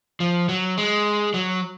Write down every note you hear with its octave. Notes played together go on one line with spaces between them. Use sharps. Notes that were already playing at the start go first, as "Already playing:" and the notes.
F3
F#3
G#3
F#3